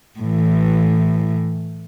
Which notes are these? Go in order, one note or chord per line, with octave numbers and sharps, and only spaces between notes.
A2 E3